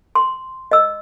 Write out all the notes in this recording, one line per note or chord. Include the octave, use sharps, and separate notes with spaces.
C6
D#5 E6